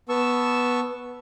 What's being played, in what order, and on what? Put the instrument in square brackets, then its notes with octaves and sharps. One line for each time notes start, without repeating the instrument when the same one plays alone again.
[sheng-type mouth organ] B3 A5 C#6 E6